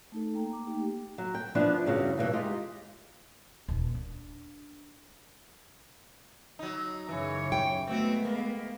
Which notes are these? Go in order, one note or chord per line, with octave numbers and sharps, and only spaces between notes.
A3 D#4 A4
A#3 G5 A#5
A#3 D6
A3 A#3 D#4 G4 G5
F#3
G5
E3 F3 B3 D4
E2 G2 C#3 E3 F#4
G2 B2 E3
G#3 D#4 F4 G4
D#1
D4
F#3 D#4
F#2 C#3 E3 C#5
G5
G#3 A3 B3 C4 F#4
A#3